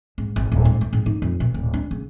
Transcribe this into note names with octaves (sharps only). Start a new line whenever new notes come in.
G#2
G#1
D#1
G#2
A3
G#2
D#4
F2
B2
D1
D4
C#3